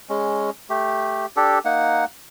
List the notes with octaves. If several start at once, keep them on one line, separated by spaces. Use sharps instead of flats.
G#3 C#4
A3 G4
D4 G4 A4
A#3 D#4 F#5